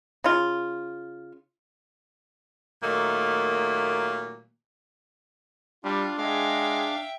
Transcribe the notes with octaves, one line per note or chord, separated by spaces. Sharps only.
C#3 F4
A#2 D#3 F#3 A3 A#3
G3 D4 F4
G#3 E5 F5 G5